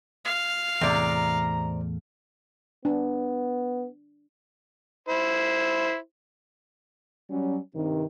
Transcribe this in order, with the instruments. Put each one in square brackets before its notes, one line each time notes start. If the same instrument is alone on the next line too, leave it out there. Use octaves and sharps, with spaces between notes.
[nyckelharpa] F5
[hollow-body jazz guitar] E2 A2 [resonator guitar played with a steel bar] C3 D5 [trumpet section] A#5
[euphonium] B3 [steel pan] D4
[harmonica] E4 C5
[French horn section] F#3 G3 C#4
G2 C3 D#3